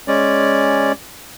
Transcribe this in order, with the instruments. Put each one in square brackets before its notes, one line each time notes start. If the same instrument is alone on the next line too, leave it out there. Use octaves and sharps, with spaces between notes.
[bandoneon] G#3 C#4 D5